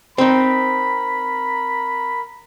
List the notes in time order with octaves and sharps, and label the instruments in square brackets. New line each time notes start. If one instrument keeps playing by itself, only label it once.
[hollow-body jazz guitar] C4 D#4 [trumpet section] A#4 B5